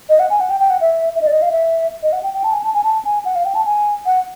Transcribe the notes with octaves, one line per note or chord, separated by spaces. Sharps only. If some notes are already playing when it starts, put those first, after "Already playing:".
D#5
F#5
G#5
F#5
G5
G5
F#5
E5
E5
D#5
D5
D#5
F5
E5
D#5
F#5
G5
G5
A5
G#5
A5
G#5
A5
G#5
F#5
F5
G5
A5
G#5
F#5